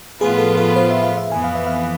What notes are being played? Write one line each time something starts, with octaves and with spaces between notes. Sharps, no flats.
A2 F3 B3 F4 G#4 B4
A4
A4
C5
E5
F5
E5
F2 E3 B3 G#5
F5
E5
F5